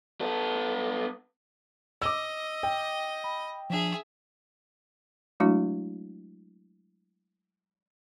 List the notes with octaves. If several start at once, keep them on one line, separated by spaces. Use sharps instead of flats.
B3 A4
D#5 D6 E6
G5
B5
F3 D4 G#4 E5
F#3 G#3 A3 D4 E4 F#4